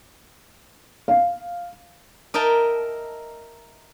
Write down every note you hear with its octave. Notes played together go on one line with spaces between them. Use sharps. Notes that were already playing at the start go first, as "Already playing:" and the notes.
F5
A#4 D#5 E5 G5 A5